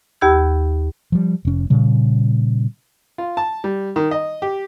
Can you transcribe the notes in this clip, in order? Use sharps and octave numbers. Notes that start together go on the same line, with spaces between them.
D#2 G4 B5 E6 G#6
F3 G3
F1 C#4
A#2 C#3 G3
F4
A5
G3
D#3
D#5
G4